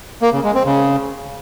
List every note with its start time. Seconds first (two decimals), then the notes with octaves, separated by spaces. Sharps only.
0.22 A#3
0.33 C#3
0.44 G#3
0.55 C4
0.66 C#3